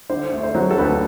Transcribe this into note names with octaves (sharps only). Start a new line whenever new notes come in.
D3 C5
A3
C5
F#3
A4
D2 B4